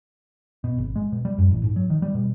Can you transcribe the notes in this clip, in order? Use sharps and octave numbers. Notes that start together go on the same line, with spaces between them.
B2
G#1
G#3
B2
G3
F#2
A1
G#2
F#3
D#3
G3
B2